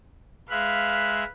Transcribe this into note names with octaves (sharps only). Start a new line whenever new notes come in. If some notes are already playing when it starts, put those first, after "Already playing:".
G#3 B4 E5 F5 F#6